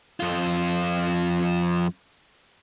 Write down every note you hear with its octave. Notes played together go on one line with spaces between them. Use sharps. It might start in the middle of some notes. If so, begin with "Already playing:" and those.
F2 F4